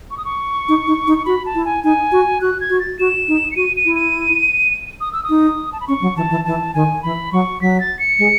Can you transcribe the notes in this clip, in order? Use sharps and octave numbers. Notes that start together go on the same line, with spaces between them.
C#6
D#6
C#6
D#4
D#4
D#4
F#4 B5
A5
E4
G#5
D#4 G#5
F#4
F#4 F#6
G#6
F#4
A6
F#4 E7
D#4
C#7
F#4 D#7
D#7
E4
D#7
D#6
E6
D#6
D#4
A5
B5
C#4 C#6
F#3
E3 A5
E3
E3 A5
D#3 G#5
E3 B5
F#3 C#6
F#3 B6
A6
C#7
G#3